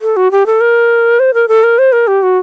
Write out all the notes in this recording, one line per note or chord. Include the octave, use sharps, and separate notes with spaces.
A4
F#4
G4
A4
A#4
C5
A#4
A4
A#4
C5
A#4
G4
F#4